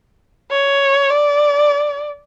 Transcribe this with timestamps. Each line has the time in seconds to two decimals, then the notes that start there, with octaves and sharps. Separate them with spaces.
0.51 C#5
1.10 D5